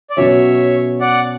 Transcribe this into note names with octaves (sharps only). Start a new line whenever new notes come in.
D5
B2 F#3 C#4 C#5 E5
D5 F#5